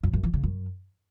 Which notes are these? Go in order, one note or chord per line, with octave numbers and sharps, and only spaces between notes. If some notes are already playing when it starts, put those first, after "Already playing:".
F#2
F#2
E3
C#3
F#2